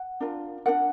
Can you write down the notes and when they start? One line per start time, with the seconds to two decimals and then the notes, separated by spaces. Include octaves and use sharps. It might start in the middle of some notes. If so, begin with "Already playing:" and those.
Already playing: F#5
0.20 D4 F4 A#4
0.66 D4 F#4 A#4 F#5